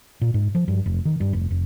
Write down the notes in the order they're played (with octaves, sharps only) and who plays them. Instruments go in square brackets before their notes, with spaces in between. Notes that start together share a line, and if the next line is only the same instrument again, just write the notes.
[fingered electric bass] A#2
G#2
F3
G2
F1
D#3
G2
F1
F1